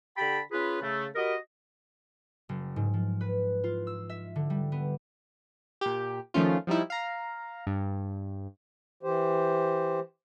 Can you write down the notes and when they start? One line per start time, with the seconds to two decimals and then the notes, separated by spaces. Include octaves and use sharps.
0.18 D3 G4 G5 A5 B5
0.52 C#4 F4 G#4 B4
0.82 C#3 A3
1.15 F#4 G4 A#4 B4 D#5
2.49 F#1
2.76 G#2
2.94 F3
3.21 B4
3.64 F4
3.87 E6
4.09 E5
4.36 D3
4.50 G3
4.72 B3
5.81 A#2 G4
6.34 D#3 F3 A3 C#4 F4
6.67 F3 G3 D#4 E4
6.90 F5 A#5
7.67 G2
9.03 E3 G4 C5